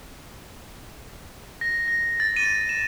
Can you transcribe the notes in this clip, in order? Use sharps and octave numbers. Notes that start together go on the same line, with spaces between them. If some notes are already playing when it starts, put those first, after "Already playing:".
A#6
A#6
A6
D#7
E7